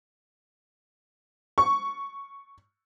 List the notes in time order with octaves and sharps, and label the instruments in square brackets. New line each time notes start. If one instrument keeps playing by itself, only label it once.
[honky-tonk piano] C#6